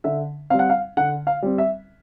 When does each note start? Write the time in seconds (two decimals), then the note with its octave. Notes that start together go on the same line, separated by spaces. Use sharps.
0.04 D3 E5
0.50 G3 C4 F5
0.59 F#5
0.69 F5
0.97 D3 F#5
1.27 F5
1.42 G3 C4
1.58 E5